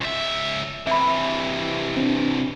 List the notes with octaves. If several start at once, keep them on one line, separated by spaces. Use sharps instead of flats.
C#2 E5
C3 E3 E5 B5
C4 D4